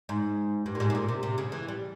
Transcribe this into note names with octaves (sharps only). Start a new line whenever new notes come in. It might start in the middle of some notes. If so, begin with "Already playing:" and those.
G#2
G2
A#2
G#2
C3
A#2
C3
C3
C#3
E3
G3